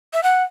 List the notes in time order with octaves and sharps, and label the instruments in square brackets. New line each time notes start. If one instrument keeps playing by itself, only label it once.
[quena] E5
F#5